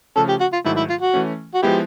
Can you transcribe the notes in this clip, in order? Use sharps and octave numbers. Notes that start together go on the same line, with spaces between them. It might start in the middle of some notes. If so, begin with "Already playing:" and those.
C#3 F3 A3 C#4 A4
G4
F#4
F4
G#2 D#3 F#3 A3 E4
E4
F4
F#4
E3 A3 C#4
F#4
F3 G#3 B3 E4 G4